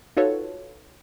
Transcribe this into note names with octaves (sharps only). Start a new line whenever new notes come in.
D#4 F4 F#4 A4 B4 C#5